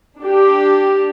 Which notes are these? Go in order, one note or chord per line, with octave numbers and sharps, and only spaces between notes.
D4 G4